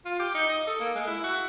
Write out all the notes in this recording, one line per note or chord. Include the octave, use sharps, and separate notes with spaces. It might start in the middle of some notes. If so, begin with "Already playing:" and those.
F4
G4
D#4
D#5
A4
A#3
G#3
E4
F#4